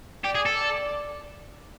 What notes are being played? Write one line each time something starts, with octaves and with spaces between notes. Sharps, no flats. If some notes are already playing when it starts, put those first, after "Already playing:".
G4 D5
G#4
A4
D5